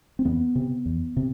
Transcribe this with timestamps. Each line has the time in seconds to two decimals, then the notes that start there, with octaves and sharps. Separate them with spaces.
0.19 C4
0.25 E2 B3
0.55 C3
0.86 E2
1.17 C3